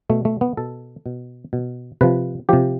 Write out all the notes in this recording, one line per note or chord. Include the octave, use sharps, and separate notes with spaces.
B2 A3
A3
B3
B2 A4
B2
B2
C3 F3 B4
C3 F3 G4